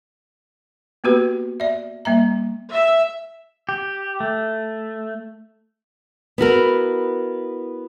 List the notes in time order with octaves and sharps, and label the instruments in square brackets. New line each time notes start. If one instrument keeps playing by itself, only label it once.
[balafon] A#3 B3 F#4 G4 B4
D5 E5
G3 A#3 E5 A#5
[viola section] E5
[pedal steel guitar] G4
A3
[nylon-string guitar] B3 E4 F#4 A#4